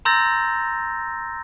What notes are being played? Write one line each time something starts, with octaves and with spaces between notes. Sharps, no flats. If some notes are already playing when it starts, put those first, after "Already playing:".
A#5 C6 E6 G6 A6 A#6